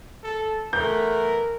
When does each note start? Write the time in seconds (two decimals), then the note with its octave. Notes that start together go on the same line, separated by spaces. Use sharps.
0.24 A4
0.73 E3 A3 B3 A#4 G6